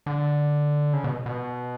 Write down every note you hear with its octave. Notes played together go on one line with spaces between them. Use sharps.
D3
C#3
B2
B2